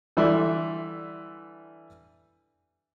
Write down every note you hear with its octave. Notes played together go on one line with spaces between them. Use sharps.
D3 E3 G3 D5 E5 C6